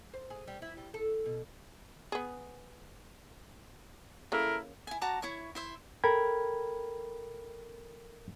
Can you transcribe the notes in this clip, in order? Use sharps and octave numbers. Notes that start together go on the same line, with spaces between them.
C5
G#4
G3
E4
G3
A4
B2
B3 G#4
C#3 A#3 E4 A4 A#4
E4 G#5
F#4 A5 A#5 D6
E4 C#5 C#6
E4 C5 E5
A4 A#4 G5 B5 G#6